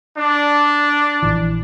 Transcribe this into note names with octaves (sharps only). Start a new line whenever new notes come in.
D4
A#1 E3